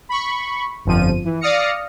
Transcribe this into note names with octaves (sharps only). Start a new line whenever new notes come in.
B5 C#6
G1 F2 F3 D#7
E3
D5 F5 D#6 F6 A#6 C#7